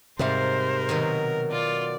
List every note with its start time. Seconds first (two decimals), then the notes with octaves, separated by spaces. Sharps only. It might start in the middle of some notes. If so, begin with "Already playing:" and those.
0.19 G#2 C3 G3 A#4 C5 F5
0.89 B2 D#3 F#3
1.51 F4 D5